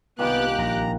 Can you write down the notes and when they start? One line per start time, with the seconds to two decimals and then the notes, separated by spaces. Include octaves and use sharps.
0.19 C2 A#2 D#3 A#3 B3 G4 F#6
0.59 A#1 A#5